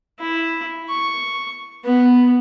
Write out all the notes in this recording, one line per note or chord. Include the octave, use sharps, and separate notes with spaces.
E4
C#6
B3